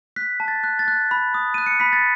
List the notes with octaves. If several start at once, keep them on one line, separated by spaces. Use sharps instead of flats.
F#6 B6
A5
A6
F#6
A6
F#6
B5
D#6
F#6 D#7
C#7
B5 B6
A6